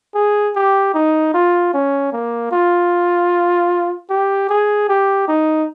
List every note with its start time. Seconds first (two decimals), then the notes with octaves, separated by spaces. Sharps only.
0.15 G#4
0.56 G4
0.94 D#4
1.34 F4
1.74 C#4
2.13 A#3
2.52 F4
4.10 G4
4.50 G#4
4.89 G4
5.28 D#4